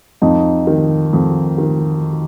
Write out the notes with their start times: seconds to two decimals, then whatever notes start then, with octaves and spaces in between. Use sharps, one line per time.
0.22 F2 D#4
0.67 D#3
1.13 F2
1.58 D#3